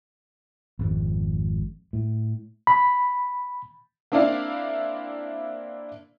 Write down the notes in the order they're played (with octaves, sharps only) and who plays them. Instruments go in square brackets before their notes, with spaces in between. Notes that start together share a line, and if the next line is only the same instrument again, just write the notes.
[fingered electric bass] G#1 F2
A2
[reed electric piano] B5
[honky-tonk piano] A#3 C4 D4 E4 D5 F5